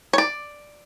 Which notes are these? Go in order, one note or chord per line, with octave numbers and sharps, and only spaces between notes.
C#5
D5